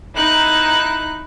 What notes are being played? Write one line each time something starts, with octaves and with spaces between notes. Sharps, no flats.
D#4 E4 F#6